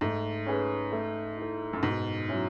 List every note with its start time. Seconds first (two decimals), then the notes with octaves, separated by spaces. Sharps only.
0.01 G#2 A3
0.46 C#4 G#4 B4
0.92 A3
1.37 E4 A4
1.73 F#2
1.82 G#2 B2
2.28 F#3 C#4 E4